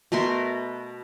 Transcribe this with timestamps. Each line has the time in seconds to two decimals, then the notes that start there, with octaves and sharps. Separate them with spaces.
0.12 B2 A3 A#4 C6